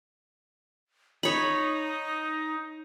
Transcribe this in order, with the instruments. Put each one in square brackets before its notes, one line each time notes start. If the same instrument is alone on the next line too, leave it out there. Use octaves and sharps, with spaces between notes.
[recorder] D#4 [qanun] C#5 B5